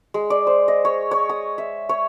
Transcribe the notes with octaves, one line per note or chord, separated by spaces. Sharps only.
G#3
D5
C5
D#5
C#5
C#5
D#6
E5
C#5